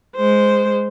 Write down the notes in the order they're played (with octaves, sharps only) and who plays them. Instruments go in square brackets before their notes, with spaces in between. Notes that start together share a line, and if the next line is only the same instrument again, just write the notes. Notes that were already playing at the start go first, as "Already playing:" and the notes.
[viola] G#3 C5